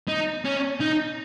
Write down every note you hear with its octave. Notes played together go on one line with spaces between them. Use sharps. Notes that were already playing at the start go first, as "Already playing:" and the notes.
D#4
C#4
D#4